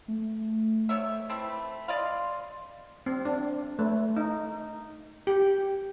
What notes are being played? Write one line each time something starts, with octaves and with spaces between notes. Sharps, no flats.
A3
D#3 C#5 E5
E3 A3 C4 B5
D5 D#5 F5 C6
C4
D4
A3
D#4
G4